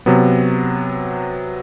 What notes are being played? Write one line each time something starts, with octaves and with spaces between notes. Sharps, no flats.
C3 F#3 B3